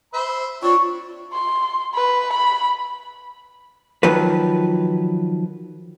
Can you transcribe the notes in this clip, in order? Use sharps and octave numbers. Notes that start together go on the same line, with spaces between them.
C5 E5 B5
C4 D4 F4 C#5 C#6
C6
B4
B5
D#3 F3 F#3 B4